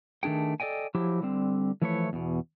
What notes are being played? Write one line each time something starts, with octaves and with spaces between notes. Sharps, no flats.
D#3 A3 D4 G#4 G5
A4 D5 D#5 G5 G#5
F3 F#3 E4 G4
D3 G3 C4
E3 F3 A3 E4 B4 C#5
E2 B2